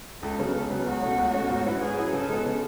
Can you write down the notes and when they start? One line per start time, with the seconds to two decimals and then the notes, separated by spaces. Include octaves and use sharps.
0.22 C#2 A4
0.39 C#3 F#3 B3
0.55 C#2
0.70 C#3 F#3 B3
0.87 C#2 F#4
1.02 B2 A3 C#4
1.18 C#2
1.34 B2 A3 C#4
1.50 G#2
1.66 F#3 C#4 E4 B4
1.81 G#2 G#4
1.97 F#3 C#4 E4 B4
2.13 C#3 A4
2.29 G#3 B3
2.46 C#3